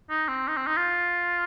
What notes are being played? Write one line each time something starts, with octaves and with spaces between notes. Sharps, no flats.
D#4
C4
D#4
C4
D#4
F4